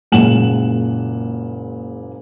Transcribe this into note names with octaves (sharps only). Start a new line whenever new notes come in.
F#1 A#2 G#3 F#5 E7 F#7